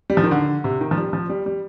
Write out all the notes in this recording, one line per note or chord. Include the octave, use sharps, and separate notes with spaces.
G3
F3
D#3
D3
C3
D#3
F3
G3
F3
G3
G3